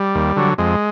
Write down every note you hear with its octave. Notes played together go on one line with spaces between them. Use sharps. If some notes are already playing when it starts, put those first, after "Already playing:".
Already playing: G3
D#2
D3 F#3
F2 G#3